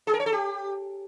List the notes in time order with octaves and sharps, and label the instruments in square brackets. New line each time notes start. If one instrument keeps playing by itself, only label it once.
[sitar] G#4
A#4
C#5
A4
G4